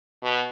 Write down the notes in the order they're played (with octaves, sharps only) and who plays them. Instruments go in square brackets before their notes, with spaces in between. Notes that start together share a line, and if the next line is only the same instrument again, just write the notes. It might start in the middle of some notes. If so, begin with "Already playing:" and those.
[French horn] B2